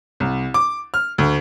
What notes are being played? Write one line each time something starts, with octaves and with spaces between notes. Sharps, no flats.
C2
D6
F6
D2